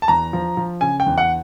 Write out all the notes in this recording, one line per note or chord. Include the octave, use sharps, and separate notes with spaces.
A5
E2 A#5
F3
F3
C#3 G#5
G5
E2
F#5